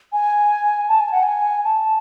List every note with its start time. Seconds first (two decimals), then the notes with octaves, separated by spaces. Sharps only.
0.13 G#5
0.89 A5
1.00 G#5
1.12 F#5
1.23 G#5
1.64 A5